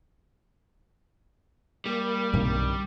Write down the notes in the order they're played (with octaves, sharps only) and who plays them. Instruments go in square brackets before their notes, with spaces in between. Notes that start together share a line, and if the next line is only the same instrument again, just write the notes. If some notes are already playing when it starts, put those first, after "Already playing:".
[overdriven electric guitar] G3 [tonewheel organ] A#3
[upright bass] B1 [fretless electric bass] G2 C3 D#3